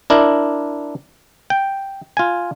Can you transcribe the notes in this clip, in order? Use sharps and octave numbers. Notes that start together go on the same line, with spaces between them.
D4 E4 A#4
G5
F4 G#5